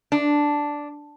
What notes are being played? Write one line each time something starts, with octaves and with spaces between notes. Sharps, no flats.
D4